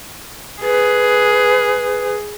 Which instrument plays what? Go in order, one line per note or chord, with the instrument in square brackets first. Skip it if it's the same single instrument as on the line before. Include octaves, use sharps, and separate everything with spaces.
[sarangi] G#4 [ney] B4